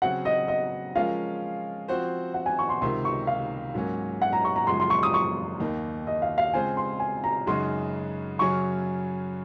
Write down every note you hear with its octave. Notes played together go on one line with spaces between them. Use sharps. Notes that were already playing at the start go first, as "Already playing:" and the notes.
C#3 F#3 C4 F#4 F#5
D#5
D#5
F3 G#3 C#4 F4 A#4 F5
F3 C4 F#4 C5
F#5
G#5
C#6
C6
C#2 C3 D#3 C6
C#6
F5
G#2 F#3 A#3 C#4
F#5
A#5
C#6
A#5
F#2 C#3 F3 G#3 C6
C6
C#6
D#6
C#6
D#2 D#3 A#3 D#4
D#5
F5
F5
C#3 G#3 C4 F4 C5 G#5
C6
G#5
A#5
F#2 C#3 G#3 D#4 F#4 C6
F#2 C#3 F#3 C#4 C#6